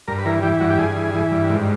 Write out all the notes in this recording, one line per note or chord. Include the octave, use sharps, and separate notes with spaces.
G2 A#4
B4
E3 A#4
E3 G4
G2 F#4
G4
G2 G#4
E3
E3
G2
G#2